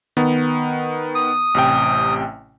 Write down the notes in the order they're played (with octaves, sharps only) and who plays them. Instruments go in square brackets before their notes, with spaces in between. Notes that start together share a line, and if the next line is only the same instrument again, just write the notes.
[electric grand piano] D#3 B3
[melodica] D#6
[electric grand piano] A1 C3 G5